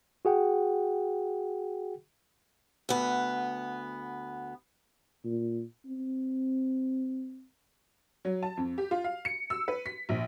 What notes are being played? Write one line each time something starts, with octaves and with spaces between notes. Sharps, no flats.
F#4 G#4 F#5 G5
D2 B3
A#2
C4
F#3
A5
F2
G4
F4
F5
C#7
E6
B4
B6
A#1